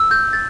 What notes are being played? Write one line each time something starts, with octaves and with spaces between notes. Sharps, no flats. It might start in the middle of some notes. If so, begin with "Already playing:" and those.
Already playing: E6
G6
A6